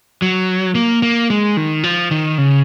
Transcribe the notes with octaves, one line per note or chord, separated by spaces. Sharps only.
F#3
A#3
A#3
G#3
D#3
F3
D#3
C#3